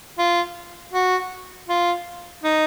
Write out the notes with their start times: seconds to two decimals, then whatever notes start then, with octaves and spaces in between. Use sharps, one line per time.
0.18 F4
0.93 F#4
1.68 F4
2.43 D#4